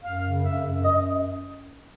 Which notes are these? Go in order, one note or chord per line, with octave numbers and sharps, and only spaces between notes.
F#2 F5
C#3
F#2 E5
F#2
F#2 D#5